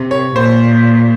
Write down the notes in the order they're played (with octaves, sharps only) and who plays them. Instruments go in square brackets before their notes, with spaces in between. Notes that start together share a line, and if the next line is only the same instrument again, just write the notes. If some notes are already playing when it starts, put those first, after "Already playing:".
Already playing: [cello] C3
[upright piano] C#5
[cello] A#2 [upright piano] C5